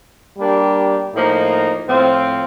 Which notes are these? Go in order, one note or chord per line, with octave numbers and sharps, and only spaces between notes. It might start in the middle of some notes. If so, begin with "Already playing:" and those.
G3 A#3 D4 G4
A2 F3 A#3 D#4
A2 F3 C4 F4